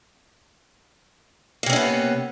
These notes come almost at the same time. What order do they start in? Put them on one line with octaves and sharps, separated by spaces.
A#3 C3 C#4 D4 B3